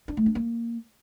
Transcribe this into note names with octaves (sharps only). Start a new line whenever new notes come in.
D4
A3
D4
A#3